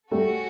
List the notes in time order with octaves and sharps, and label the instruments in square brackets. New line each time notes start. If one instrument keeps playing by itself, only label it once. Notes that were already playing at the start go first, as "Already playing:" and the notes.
[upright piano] G3 A3 [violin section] C#4 F#4 A4